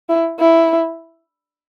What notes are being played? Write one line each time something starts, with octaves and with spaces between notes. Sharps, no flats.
E4
E4